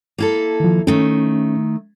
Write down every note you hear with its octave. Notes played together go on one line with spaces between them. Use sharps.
A#3 E4 A4
D#3 F3
D#3 A3 C#4